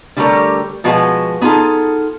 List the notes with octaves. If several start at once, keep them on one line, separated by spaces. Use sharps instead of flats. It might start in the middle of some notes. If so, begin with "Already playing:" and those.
D3 G3 A3 G4 A#4 C#5
B2 F3 G#3 F#4 B4
B3 D#4 F4 G#4 A4